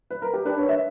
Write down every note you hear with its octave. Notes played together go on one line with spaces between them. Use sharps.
B4
A#4
G4
D4 B4
C#5
E5